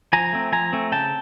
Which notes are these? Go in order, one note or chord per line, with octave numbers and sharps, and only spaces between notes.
F3 G#5 A#5
A3 C4
F3 G#5 A#5
A3 C4
C#3 G5 A5